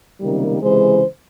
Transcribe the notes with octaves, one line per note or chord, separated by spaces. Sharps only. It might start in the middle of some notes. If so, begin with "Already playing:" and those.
C#2 C3 D#3 G3 A#3
C#2 C3 E3 G#3 C5